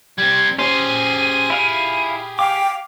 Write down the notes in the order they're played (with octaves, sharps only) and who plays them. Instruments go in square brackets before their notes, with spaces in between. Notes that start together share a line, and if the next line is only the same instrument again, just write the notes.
[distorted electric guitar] G3 C4 [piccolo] G#6
[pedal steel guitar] C#4 C5 [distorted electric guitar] G4 G#4 [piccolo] D#7
[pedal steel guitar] E4 F5
[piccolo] F5 [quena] G5 [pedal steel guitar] D6